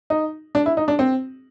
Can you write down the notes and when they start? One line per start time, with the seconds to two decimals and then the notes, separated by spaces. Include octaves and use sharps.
0.10 D#4
0.55 D4
0.66 E4
0.77 D#4
0.88 D4
0.99 C4